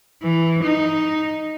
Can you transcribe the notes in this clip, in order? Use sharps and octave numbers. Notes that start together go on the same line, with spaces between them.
E3
D#4